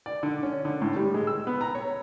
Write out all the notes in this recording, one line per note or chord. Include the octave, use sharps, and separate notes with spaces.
D5
D3
C#4
D3
A2
G3
G#3
E6
B3
A#5
C#5